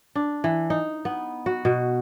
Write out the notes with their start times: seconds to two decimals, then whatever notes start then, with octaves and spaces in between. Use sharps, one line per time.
0.15 D4
0.44 E3
0.70 D#4
1.05 B3
1.46 F#4
1.65 B2